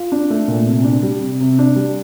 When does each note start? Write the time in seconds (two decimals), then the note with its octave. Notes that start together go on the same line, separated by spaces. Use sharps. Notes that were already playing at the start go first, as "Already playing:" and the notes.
Already playing: F4
0.12 D4
0.30 A3
0.48 A#2
0.66 C3
0.84 D4
1.03 G3
1.21 C3
1.40 C3
1.59 D4
1.76 G3